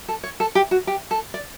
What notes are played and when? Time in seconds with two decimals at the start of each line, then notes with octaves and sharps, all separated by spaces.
0.08 A4
0.24 C#5
0.40 A4
0.55 G4
0.71 F#4
0.87 G4
1.11 A4
1.34 D5